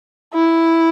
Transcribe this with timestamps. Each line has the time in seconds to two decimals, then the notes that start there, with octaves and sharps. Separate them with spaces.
0.34 E4